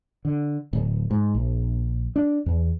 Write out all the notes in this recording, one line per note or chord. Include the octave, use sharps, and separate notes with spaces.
D3
D1
G#2
A#1
D4
E2